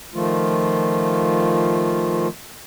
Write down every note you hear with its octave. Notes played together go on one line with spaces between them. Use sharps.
D#3 F3 A3 F4